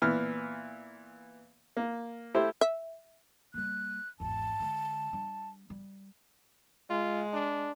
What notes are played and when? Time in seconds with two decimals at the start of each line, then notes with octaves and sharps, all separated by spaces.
0.02 A#2 E3 B3 F6
1.77 A#3
2.34 A3 E4 G4 C5
2.61 E5
3.54 G3 A#3 F#6
4.20 G#1 E2 A5
4.60 D3 G#3
5.13 G3 D4
5.70 G3
6.90 G#3 F4
7.33 D4